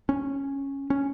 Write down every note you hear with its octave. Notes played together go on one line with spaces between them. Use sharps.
C#4
C#4